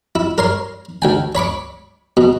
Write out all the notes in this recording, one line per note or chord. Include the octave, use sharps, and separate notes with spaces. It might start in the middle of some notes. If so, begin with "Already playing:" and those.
E4
A#4 C#5 C6
D2 G5 G#5
C#5 B5 C#6 D6
B2